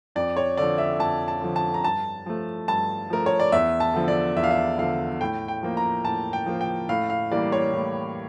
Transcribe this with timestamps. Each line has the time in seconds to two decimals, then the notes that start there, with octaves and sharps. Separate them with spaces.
0.16 F2 D5
0.37 C#5
0.57 D3 F3 D5
0.78 E5
1.00 F2 A5
1.28 A5
1.42 D3 F3
1.56 A5
1.74 A#5
1.84 G2 A5
2.26 F3 A3
2.68 G2 A5
3.10 F3 A3 A#4
3.26 C#5
3.40 D5
3.52 E2 E5
3.80 A5
3.94 D3 F3
4.08 D5
4.36 E2 E5
4.44 F5
4.51 E5
4.78 D3 F3 F5
5.21 A2 G5
5.48 G5
5.63 F3 A#3
5.77 A#5
6.05 A2 A5
6.33 G5
6.46 F3 A#3
6.61 G5
6.89 A2 F5
7.10 F5
7.31 E3 G3 A#3 D5
7.52 C#5
7.73 A2